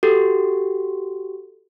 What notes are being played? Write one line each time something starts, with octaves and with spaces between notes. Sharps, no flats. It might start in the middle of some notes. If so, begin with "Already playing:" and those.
F#4 G4 A4